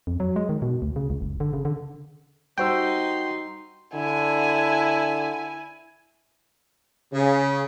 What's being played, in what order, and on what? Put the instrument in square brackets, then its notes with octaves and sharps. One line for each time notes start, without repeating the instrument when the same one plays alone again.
[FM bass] F2
F#3
G#3
D#3
B2
D2
C#3
C#2
F#1
D3
C#3
D3
[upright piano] G3 C5 E6 [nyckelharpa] D#4 C6 [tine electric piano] F#4 G5
[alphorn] D3 [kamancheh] E4 G#5
[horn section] C#3